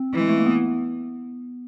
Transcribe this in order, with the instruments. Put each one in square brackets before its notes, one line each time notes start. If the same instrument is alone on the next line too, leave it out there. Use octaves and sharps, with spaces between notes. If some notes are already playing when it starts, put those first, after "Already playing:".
Already playing: [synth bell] C4
[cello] E3
[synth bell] G#3
A3
A#3
B3